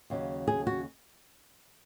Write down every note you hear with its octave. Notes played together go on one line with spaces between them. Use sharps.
D#2 C#3 F#3
G#4
F#4